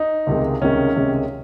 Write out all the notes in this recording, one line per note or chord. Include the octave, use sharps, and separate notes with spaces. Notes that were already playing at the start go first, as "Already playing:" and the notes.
Already playing: D#4
C#2 C3 D#3 G#3
C#2 C3 D#3 G#3 C#4
C#2 C3 D#3 G#3